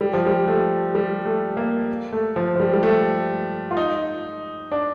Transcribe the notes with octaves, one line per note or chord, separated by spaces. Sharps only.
G3
F3
G3
A3
G3
A3
A#3
A3
F3
F3
G3
G3
A3
F4
D#4
D4